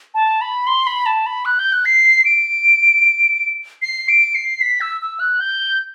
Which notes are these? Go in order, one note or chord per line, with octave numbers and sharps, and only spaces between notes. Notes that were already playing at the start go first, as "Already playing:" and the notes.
A5
B5
C6
B5
A5
B5
F#6
G6
F#6
C7
D7
C7
D7
C7
B6
E6
E6
F#6
G6